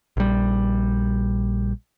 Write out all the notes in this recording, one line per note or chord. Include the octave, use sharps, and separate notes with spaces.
A#1 G3